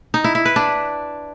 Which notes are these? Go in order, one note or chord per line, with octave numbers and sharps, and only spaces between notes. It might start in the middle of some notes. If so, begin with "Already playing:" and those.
D#4
E4
E4
B4
D4